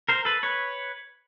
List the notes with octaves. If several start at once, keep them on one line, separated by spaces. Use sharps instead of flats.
A#4 C5
A4 B4
B4 C#5